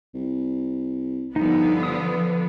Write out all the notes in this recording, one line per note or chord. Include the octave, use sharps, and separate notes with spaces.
C2
G1 D3 F3 B3 D#4
D#6